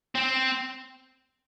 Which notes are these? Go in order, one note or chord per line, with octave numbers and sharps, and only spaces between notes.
C4